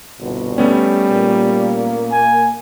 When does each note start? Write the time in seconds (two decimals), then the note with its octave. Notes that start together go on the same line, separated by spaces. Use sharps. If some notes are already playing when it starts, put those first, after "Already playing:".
0.19 G1 C2 B2
0.58 G3 A3 B3 C#4
1.09 A#2 A#3
2.12 G#5